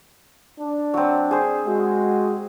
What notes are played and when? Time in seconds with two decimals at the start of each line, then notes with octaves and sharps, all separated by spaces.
0.58 D4
0.94 F#3 C4
1.31 G#4 C5
1.65 G#3 F#4